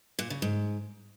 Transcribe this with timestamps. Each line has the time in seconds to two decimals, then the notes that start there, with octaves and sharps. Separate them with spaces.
0.19 A#2
0.30 C#3
0.42 G#2